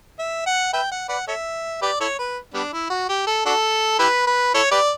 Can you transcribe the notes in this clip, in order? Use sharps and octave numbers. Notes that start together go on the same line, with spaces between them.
E5
F#5
B4 E5 G5
F#5
B4 D5 F#5
A4 C#5 E5
G4 B4 D5
E4 A4 C#5
B4
G3 B3 D4
E4
F#4
G4
A4
D4 F#4 A4
E4 G4 B4
B4
E4 A4 C#5
G4 B4 D5